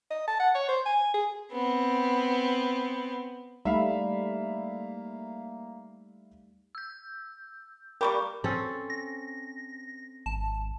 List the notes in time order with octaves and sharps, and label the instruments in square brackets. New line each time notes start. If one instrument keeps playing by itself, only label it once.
[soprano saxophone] D#5
A5
F#5
C#5
C5
G#5
G#4
[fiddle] B3 C4
[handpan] G3 A3 D#4 [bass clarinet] A#3 [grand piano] E5 F5 B5
[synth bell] E6 G6
[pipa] G3 A#3 G4 [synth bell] A#4 B5 C#6
[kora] C4 C#4 A4
[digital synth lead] A#6
[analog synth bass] G#1 [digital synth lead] A5